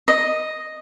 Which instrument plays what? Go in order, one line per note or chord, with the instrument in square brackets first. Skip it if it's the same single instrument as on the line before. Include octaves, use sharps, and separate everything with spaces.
[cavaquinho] D#5